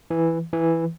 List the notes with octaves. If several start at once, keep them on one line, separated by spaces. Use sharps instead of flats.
E3
E3